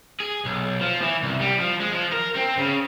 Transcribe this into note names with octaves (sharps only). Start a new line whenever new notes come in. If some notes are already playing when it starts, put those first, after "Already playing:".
G#4
B1
F3
E3
C2
G3
F3
G#3
F3
A#4
C4
C#3